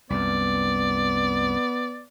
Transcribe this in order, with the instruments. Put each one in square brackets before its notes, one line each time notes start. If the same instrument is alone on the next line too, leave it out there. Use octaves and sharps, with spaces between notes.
[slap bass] C2 F#2 [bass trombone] B3 [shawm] D5